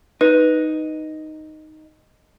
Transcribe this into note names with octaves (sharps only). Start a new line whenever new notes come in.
D#4 B4